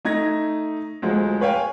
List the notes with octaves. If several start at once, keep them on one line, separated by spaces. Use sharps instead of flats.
A3 D#4 G#6 A#6
D2 F3 F#3 G#3
B4 C#5 F5 G5 G#5